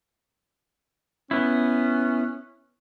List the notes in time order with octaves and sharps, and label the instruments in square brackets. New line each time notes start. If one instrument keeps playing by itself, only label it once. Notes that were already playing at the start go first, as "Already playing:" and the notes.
[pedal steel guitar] B3 E4 [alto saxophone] C#4